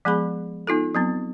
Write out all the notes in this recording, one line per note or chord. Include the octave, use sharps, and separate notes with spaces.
F3 G#3 B3 G#4 B5
B3 D#4 F4 A4
F#3 B3 C4